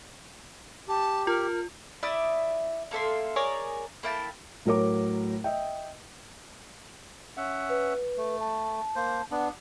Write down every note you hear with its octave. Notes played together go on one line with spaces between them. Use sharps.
G4 A5
F4 A#4
E4 D5 E5 D#6
A#3 A4 E5 C6
G#4 A#4 C#5 D5
A#3 E4 G5 A5
A2 F#3 A#4 C#5 D6
D#5 E5 G5
C#4 E5 F#5
B4
A3
A5
A#3 C5
B3 D4 F#5